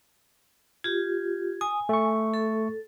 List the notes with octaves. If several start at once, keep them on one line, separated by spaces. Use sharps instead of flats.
F4 G4 G#6
G#5 D#6
A3 C#6
A4